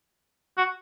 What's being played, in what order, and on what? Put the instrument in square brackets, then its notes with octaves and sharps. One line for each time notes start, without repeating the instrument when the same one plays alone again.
[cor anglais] F#4